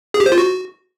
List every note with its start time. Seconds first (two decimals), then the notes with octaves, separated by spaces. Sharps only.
0.14 G#4
0.20 G4
0.26 C5
0.32 F4
0.38 F#4